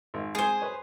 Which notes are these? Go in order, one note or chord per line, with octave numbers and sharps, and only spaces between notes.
G#1
G#3 C4 G#4 C5
B4 C#5 G#5